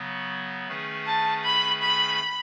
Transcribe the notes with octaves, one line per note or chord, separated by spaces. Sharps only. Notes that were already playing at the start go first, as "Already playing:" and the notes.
Already playing: C#3 F#3 B3
D#3 A3 C#4 G#4 B4
A5
B5
B5